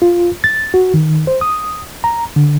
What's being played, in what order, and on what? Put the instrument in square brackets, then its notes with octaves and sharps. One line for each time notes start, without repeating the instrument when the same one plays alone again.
[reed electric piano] F4
A6
F#4
D#3
C5
D#6
A#5
D3